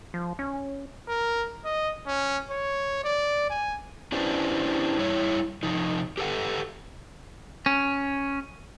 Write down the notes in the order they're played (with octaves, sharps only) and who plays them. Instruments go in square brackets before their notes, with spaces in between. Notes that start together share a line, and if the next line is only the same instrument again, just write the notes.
[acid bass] F3
C#4
[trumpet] A#4
D#5
C#4
C#5
D5
G#5
[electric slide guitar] C#4 D4 E4 G4 B4 C5
G3 E4 C#5
C3 F3 D#4
G4 A4 B4 F#5
[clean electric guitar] C#4